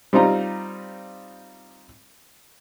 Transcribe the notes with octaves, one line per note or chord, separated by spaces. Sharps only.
G3 C4 D#4 F4 A#5